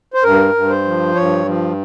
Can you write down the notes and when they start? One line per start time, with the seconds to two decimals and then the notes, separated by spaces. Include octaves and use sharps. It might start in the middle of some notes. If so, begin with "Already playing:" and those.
0.14 C5
0.24 G2 A#4
0.54 G2
0.70 C5
0.85 F3
1.15 G2 C#5
1.46 F3